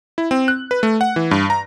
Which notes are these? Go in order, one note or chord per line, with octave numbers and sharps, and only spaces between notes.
E4
C4
F#6
B4
A3
F#5
E3
G2
A#5